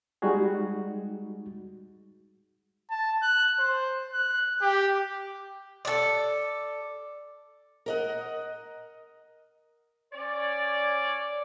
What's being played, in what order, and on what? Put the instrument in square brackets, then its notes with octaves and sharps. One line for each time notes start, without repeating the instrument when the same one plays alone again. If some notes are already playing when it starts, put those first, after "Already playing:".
[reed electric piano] G3 G#3 D#4 F#4 G#4
[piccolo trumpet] A5
F#6
C5
F#6
G4
[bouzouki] A4 D5
[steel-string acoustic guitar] A#4 D#5 F#5
[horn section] C#4 C#5 D5